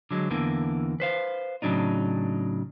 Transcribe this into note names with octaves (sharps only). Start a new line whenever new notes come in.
D3 F#3 G#3
E2 D3 E3 A#3
B4 C5 F5
A2 C#3 F#3 D4 D#4